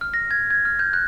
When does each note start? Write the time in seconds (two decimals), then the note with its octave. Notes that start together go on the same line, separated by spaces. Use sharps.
0.01 F6
0.14 A#6
0.31 G#6
0.50 G#6
0.65 F6
0.79 G6
0.93 F#6